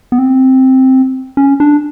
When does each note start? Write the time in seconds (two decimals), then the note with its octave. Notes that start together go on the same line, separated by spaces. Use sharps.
0.12 B3
0.18 C4
1.37 C#4
1.60 D4